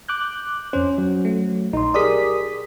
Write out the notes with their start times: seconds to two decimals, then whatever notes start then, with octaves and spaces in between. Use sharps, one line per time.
0.08 D6 F#6 G6
0.73 F2 C#4 C5
0.98 F#3
1.25 A3
1.73 A#1 D#4 C6
1.94 G4 G#4 A#4 D5 D#6 B6